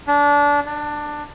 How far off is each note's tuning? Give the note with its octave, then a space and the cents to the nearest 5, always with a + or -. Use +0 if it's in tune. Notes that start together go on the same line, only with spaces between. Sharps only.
D4 -25
D4 +15